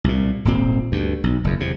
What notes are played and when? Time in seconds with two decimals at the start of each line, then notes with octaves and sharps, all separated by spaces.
0.04 C2 A#2
0.45 D#1 G#1 A#2 C4
0.92 D2 G2
1.24 B1
1.44 F#1 E2
1.60 E2 C3